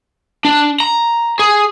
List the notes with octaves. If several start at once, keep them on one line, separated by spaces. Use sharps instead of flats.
D4
A#5
G#4